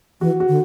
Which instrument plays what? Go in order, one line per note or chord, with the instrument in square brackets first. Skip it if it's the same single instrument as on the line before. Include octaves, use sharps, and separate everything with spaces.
[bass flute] E3 [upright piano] F#4
[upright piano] F#4
[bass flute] D3